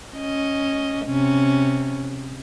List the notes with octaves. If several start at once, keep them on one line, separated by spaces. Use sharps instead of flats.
C#4 D#5
C3 C#4